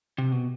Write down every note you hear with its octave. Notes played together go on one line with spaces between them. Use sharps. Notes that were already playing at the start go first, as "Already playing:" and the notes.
C3
B2